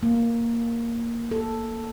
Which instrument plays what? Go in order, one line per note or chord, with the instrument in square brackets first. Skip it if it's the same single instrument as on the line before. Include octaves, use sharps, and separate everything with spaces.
[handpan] A#3
A4